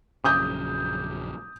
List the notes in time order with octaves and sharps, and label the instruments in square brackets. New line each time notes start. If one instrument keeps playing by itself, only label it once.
[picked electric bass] A#1 F#2 C#3 [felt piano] D6 D#6 G6